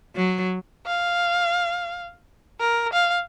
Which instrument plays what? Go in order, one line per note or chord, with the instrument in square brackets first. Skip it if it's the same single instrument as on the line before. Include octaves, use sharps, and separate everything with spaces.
[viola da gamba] F#3
[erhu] F5
A#4
F5